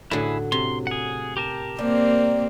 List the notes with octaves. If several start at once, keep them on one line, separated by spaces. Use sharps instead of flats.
A2 D3 F#3 E4 G#4
C3 C6
G#4 F#5
G4 A#4 A5
G3 A#3 C4